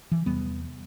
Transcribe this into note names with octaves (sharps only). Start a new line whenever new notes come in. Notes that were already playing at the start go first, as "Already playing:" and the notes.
E3
E2 C3 G3 B3